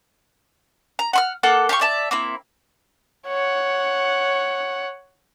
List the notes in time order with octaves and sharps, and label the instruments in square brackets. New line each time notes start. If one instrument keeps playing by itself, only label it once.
[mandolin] A#5
F#5 C6 F6
A#3 A4 F#5
G4 F5 A5 C#6
D5 E5 A5
A#3 C4 E4
[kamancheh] C#5 F#5